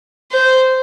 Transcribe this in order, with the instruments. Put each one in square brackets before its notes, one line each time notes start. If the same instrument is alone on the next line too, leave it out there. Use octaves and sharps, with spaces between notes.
[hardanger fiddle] C5